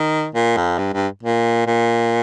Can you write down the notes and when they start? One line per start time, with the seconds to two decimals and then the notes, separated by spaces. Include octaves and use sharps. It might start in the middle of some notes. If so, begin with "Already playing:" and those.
Already playing: D#3
0.35 A#2
0.57 F2
0.79 G2
0.94 G2
1.23 A#2
1.67 A#2